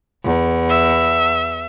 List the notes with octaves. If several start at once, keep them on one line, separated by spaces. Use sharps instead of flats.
E2
E5